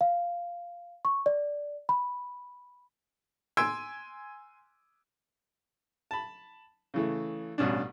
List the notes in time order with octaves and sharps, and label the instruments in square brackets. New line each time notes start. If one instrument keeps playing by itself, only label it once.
[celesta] F5
C#6
D5
B5
[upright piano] G#5 C6 E6 G#6 D7
[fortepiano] A5 B5
C#3 E3 A3
A1 G2 B2 C#4 D4